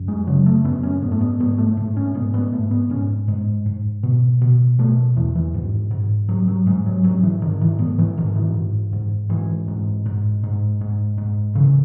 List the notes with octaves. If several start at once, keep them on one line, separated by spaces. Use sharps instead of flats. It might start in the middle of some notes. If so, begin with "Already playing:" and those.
Already playing: F#2
G#3
C#3 F#3
A3
F#2 B3
C#4
G#2 B3
A3
B3
G#2 B3
A3
G#2 A3
C#4
G#2 B3
B3
G#2 A3
B3
G#2 C#4
G#2 G#3
G#2
B2
B2
B2 A3
E2 E3
E3
G#2
G#2
G#2 F#3
F#3
G#2 G#3
F#3
G#2 F#3
E3
G#2 D#3
E3
G#2 B3
E3
G#2 D#3
E3
G#2
G#2
G#2 E3
G#2
G#2
G#2
G#2
G#2
C#3 E3